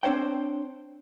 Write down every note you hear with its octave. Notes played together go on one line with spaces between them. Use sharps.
C4 D4 C5 C#5 G5